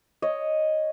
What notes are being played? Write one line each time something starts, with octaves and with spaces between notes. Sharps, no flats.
C#5 D#5